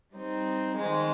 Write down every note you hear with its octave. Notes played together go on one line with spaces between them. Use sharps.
G3 C4 D#4
F2 D#3 G#3